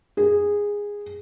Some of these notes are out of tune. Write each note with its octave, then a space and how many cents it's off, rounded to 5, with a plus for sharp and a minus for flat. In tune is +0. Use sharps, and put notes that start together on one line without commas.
G#4 -15